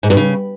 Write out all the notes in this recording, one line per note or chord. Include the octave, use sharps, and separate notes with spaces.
G#2
G2
C#3